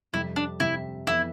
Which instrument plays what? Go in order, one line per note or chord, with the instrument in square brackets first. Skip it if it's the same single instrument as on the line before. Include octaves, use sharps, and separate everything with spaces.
[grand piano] F2 C3 G3 [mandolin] E4
[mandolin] D4
[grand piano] F2 C3 G3 [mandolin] E4
[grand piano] F2 E3 B3 [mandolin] E4